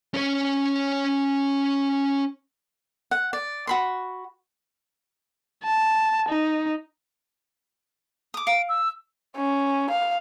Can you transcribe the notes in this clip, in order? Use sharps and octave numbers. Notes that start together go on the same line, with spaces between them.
C#4 C#5
F#5
D5
F#4 B5 C6
A5
D#4
D6 D#6
F5 D7
E6
C#4
F5